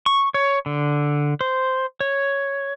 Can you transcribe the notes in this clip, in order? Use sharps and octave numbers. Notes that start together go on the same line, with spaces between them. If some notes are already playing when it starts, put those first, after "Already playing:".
C#6
C#5
D3
C5
C#5